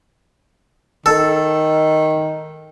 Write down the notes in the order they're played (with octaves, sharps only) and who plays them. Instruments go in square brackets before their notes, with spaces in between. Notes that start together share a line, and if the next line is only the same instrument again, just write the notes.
[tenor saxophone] D#3 [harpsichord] A4